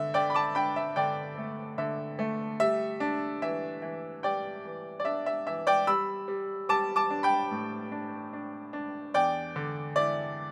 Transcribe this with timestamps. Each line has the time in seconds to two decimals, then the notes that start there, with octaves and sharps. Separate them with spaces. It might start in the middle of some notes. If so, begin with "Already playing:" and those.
Already playing: D3 E5
0.14 D3 D5 G5
0.30 B5
0.35 A5 D6
0.55 D4 G5 B5
0.76 E5
0.96 D3 D5 G5
1.38 A3
1.78 D3 E5
2.19 A3
2.60 G3 E5
3.00 D4
3.42 E3 E5
3.82 E3
4.23 G3 D5 G5
4.65 E3
5.00 D5
5.05 D4 E5
5.26 E5
5.47 E3 E5
5.67 D5 G5
5.87 G3 B5 E6
6.28 G3
6.69 G3 A5 D6
6.96 A5 D6
7.10 D4
7.23 G5 B5
7.51 A2
7.92 D4
8.33 D4
8.73 D4
9.14 E2 D5 G5
9.56 D3
9.96 E4 D5